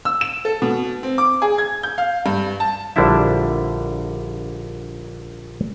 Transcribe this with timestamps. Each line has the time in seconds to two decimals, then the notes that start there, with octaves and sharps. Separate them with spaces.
0.05 E6
0.21 E7
0.45 A4
0.62 B2
1.03 C4
1.18 D6
1.42 G#4
1.58 G#6
1.83 G6
1.98 F5
2.26 G2
2.60 A5
2.96 A#1 D3 G3 D4 E4 E5